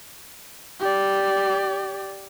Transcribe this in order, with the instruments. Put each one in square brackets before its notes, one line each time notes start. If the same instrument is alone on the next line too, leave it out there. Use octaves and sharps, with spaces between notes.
[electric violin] G4 D5